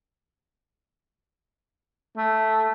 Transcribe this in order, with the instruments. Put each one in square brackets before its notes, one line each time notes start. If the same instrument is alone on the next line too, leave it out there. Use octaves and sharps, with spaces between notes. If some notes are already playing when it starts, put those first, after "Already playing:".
[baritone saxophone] A3